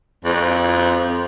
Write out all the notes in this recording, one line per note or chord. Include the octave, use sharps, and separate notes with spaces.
F2
F2